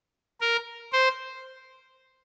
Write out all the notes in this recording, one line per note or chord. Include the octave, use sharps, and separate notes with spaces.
A#4
C5